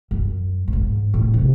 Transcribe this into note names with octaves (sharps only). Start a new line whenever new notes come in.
F#2
F#2
G#2
A2
C3